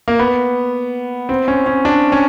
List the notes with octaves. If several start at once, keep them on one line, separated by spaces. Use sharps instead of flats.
A#3
B3
C4
C#4
C#4
D4
C#4